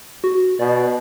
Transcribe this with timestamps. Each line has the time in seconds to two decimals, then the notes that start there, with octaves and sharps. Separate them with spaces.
0.24 F#4
0.59 B2 D5